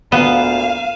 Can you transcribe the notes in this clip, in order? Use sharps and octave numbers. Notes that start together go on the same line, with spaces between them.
D2 A#2 B3 F5 D#7 E7